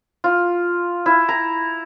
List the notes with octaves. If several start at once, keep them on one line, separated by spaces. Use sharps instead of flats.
F4
E4
A#5